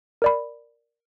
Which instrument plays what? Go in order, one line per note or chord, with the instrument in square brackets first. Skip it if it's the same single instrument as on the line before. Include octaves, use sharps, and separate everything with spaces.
[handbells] A#4 D5 B5